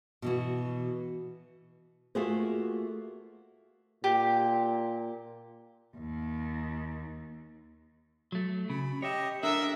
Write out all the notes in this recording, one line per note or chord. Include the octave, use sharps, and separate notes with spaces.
B2 E3 F#4
A3 A#3 F4 F#4 G#4 C5
A#2 G4
D#2
F#3 A3
C#3 B5
G4 C#5 D#5 E5
D4 A4 A#4 E5 D#6 E6